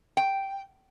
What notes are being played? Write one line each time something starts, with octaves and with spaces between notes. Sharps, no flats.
G5